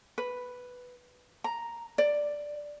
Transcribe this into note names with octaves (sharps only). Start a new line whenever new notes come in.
B4
A#5
D5